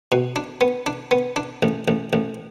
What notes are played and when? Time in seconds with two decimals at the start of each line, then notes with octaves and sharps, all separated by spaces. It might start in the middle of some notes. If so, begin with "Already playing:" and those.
0.12 B2
0.36 D4
0.61 B3
0.86 D4
1.11 B3
1.36 D4
1.63 A1
1.88 A1
2.13 A1